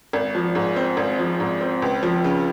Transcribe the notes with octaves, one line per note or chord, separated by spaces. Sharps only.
G#1
F3
G#2
C4
G#1
F3
G#2
C4
C#2
F3
C#3